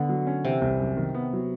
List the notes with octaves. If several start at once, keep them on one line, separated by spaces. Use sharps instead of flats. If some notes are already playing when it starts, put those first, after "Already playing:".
Already playing: D3 B3
F#3
C#4
C3 E3
C2
F#2
D#3
B3
F#3